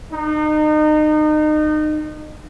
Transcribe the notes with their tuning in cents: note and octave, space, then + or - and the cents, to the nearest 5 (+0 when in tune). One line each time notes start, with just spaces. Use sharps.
D#4 -30